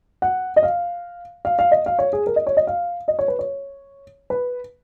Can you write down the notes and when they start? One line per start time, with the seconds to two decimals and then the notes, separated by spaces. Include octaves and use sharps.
0.22 F#5
0.56 D#5
0.63 F5
1.45 F5
1.59 F5
1.71 D#5
1.86 F5
1.99 C#5
2.13 G#4
2.27 A#4
2.36 D#5
2.47 C#5
2.57 D#5
2.67 F5
3.08 D#5
3.19 C#5
3.28 B4
3.39 C#5
4.30 B4